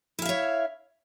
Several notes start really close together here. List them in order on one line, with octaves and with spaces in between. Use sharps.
E4 F5 E5 C#5